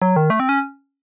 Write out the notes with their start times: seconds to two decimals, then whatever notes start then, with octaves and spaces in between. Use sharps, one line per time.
0.02 F#3
0.16 D#3
0.30 A3
0.40 C4
0.49 C#4